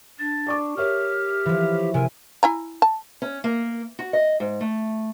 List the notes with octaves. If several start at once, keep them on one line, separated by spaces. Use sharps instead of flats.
D4 A6
D5 C#6 D6
G4 A#4 C#5 E5 F6
E3 F3
C3 A#4 G#5
E4 G#5 A#5
A5
C#4
A#3
F#4
D#5
G#2
A3